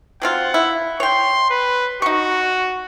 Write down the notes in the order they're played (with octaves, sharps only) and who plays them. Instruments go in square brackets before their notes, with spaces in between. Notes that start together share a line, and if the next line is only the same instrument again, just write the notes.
[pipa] F#3 C4 F4 [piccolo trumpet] F#5
[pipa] E4
[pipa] C#5 G5 [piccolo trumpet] C6
[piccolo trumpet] B4
[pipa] D#4 C#6 [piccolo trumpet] F#4